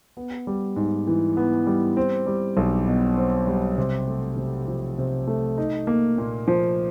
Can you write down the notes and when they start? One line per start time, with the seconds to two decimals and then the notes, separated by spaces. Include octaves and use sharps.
0.17 B3
0.47 G3
0.76 G#2
1.07 E3
1.37 B3
1.67 G3
1.97 C4
2.27 G3
2.57 B1
2.87 B2
3.17 C4
3.47 G3
3.78 C3
4.08 A3
4.37 C3
4.67 F3
4.98 C3
5.27 A3
5.58 D#4
5.87 A#3
6.18 A#2
6.48 F3